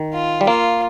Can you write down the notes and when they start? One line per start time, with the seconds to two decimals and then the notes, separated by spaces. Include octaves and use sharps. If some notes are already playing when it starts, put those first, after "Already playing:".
Already playing: D#3
0.13 F4
0.41 G3
0.47 A#3 F4